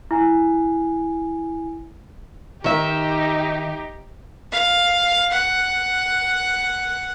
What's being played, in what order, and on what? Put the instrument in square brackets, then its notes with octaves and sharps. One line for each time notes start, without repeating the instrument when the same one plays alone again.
[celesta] E4 G#5
[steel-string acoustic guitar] D#3 E5 [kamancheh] D#4 G4
[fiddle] F5
F#5